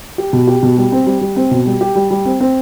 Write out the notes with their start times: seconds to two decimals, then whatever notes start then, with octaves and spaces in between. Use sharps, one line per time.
0.18 G4
0.33 B2
0.47 G4
0.63 B2
0.77 G3
0.92 C4
1.06 G3
1.21 G3
1.36 C4
1.51 B2
1.66 G3
1.81 G4
1.95 G3
2.11 G3
2.25 C4
2.40 C4